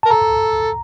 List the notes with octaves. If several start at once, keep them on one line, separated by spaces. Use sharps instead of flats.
A#4 A5
A4 A#5